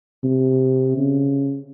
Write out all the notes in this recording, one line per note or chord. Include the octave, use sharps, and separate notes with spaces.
C3
C#3